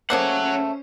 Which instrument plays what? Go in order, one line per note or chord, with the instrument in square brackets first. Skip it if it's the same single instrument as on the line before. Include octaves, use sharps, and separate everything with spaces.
[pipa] C#3 A3 A#3 [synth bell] C#4 C5 [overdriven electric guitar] C#5 F#5